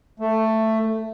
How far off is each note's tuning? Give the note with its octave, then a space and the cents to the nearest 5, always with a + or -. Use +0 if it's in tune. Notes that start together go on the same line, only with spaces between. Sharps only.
A3 +10